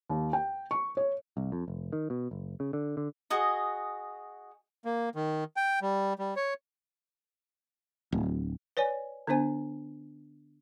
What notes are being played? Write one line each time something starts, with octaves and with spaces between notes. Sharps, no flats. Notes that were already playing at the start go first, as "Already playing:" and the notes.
D#2
G5
C#6
C#5
C2
F2
F1
D#3
B2
F#1
C#3
D3
D3
F#4 G#4 D#5
A#3
D#3
G5
G3
G3
C#5
D1
B4 C#5 D5 G#5
D3 B3 D4 C5 G#5